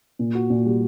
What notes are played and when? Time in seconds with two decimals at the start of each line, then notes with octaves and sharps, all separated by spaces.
0.19 A#2
0.35 F#4
0.50 A#2
0.66 G3